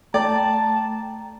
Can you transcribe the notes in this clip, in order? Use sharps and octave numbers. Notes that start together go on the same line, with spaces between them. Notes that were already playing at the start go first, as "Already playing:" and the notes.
A3 D5 G5 A5 A#5